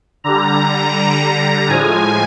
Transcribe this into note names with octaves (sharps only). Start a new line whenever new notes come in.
D3 G3 A#5
A2 F3 G#3 G#5